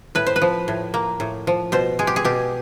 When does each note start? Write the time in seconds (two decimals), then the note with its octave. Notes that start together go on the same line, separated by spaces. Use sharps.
0.15 A2 B4
0.26 C5
0.36 B4
0.42 F3
0.68 A2
0.94 A#3
1.20 A2
1.47 F3
1.72 B2 C5
1.99 G#3 G#4
2.07 G4
2.16 G#4
2.25 B2 G4